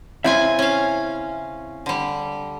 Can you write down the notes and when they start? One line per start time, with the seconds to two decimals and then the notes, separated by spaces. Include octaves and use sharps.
0.24 C#3 C4 E4 F4 E5 G#5
0.59 C#4 F5
1.86 D3 G3